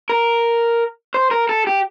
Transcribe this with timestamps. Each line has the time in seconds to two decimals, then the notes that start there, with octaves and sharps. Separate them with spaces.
0.09 A#4
1.14 C5
1.31 A#4
1.49 A4
1.67 G4